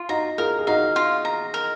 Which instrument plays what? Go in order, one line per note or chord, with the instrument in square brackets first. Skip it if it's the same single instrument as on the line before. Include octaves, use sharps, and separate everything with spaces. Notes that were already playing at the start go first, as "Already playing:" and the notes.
Already playing: [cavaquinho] F4
[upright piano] D#4 F#4 [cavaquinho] A#5
[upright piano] F4 G#4 [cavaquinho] A#4
[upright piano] G#4
[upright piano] D#4 F#4 [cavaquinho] F5
[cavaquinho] F4
A#5
A#4